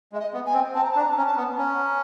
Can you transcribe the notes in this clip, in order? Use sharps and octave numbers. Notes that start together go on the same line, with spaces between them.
G#3 E5
D#5
B3
G#5
C4
C4 A5
A#5
A5
D4
A#5
A5
C#4 A#5
A5
B3
C#4 A#5